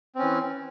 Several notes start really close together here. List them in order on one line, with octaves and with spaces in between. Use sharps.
C4 C#4 E3